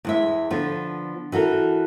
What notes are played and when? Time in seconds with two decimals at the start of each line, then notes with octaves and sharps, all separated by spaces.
0.05 E2 G#3 E5
0.50 D3 F3 B3
1.32 E3 F#4 A4 A#4